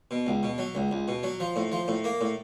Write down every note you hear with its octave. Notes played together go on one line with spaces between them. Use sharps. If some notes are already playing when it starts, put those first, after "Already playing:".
B2
C#2
B2
F#3
C#2
C#2
B2
F#3
F3
A2
F3
A2
A#3
A2